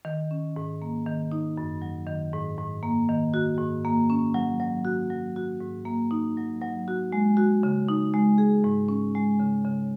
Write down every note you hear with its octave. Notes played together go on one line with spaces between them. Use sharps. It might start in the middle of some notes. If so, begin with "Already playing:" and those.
D#3
C#4
G#2
A#3
D#3
D#4
F#2
F#3
D#3
G#2
G#2
A#3
D#3
F#4
G#2
A#3
C#4
F#3
F#3
F#4
F#3
F#4
G#2
A#3
D#4
F#3
F#3
F#4
G#3
F#4
C#3
D#4
G#3
G#4
G#2
C#4
G#3
C#3
C#3